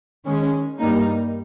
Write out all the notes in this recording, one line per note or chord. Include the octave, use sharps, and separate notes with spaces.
D#3 G#3 C#4
G2 G3 A#3 D#4